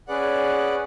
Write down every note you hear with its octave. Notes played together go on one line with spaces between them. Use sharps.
C#4 G#4 B4 D5 F#5